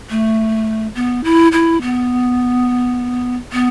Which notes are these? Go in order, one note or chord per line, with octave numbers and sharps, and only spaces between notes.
A3
B3
E4
E4
B3
B3